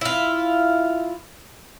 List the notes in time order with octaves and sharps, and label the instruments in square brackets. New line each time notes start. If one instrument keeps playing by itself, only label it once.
[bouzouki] E4 F4